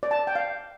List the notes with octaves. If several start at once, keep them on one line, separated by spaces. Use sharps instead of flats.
D5
A5
D5
G5
F5